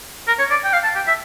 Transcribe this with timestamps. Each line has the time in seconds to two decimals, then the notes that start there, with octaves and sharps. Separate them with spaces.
0.28 A#4
0.39 C#5
0.51 D5
0.65 G5
0.73 F5
0.84 A5
0.96 G5
1.07 E5